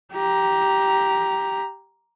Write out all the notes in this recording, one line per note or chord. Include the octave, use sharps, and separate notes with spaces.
G4 A#5